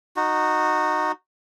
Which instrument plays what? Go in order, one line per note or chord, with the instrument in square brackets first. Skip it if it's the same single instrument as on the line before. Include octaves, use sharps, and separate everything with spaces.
[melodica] D#4 F#4